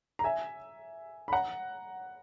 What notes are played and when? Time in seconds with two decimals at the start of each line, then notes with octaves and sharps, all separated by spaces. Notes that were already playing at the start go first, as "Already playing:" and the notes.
0.19 A#5
0.24 E5 G#5
1.28 B5
1.32 F#5 A#5